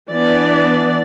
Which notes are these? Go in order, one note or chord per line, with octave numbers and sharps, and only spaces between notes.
E3 B3 D4 D5